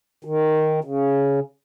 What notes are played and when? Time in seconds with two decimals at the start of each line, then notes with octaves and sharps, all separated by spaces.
0.25 D#3
0.84 C#3